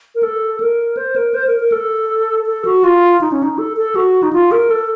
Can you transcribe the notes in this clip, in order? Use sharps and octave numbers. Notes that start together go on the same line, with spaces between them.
A#4
A4
A#4
C5
A#4
C5
A#4
A#4
A4
A4
F#4
F4
D#4
C#4
D#4
A4
A4
F#4
D#4
F4
A#4
A4